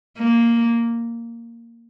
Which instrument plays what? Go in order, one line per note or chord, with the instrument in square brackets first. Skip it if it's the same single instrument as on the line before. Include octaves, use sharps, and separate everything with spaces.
[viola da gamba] A#3